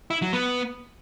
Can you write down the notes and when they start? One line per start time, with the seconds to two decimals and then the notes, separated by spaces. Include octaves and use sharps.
0.10 E4
0.22 F#3
0.33 B3